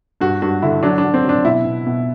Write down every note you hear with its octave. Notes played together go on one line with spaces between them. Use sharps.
G2 F#4
G2 F#4
D3 E4
F#3 D4
D4
F#3
C4
F#3 D4
B2 E4
B2
B2